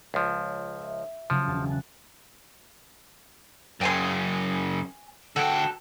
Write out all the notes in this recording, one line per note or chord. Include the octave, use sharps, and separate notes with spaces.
C#2 F3
E5
C#3 F3 F#3
E1 A5
G#5 A5 F#6
F#2 C#3 G5 G#5 C6
D2 F#4 A4 G5